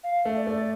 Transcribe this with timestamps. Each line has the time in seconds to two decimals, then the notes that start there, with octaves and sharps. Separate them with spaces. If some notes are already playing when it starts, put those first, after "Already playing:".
0.03 F5
0.25 A3
0.37 D5
0.47 A3
0.53 D5